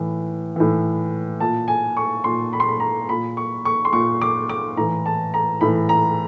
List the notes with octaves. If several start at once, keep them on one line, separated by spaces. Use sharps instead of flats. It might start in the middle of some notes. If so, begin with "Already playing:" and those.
Already playing: A2 E3
A2 E3
A#2 A5
G#5
C#6
A#2 C6
B5
C6
B5
A#5
A#2 B5
C#6
C#6
C6
A#2 C#6
D6
D6
A2 E3 A#5
A5
A#5
A2 E3 B5
A#5